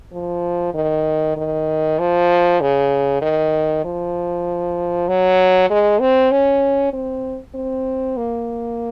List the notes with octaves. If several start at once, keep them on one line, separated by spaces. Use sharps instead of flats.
F3
D#3
D#3
F3
C#3
D#3
F3
F#3
G#3
C4
C#4
C4
C4
A#3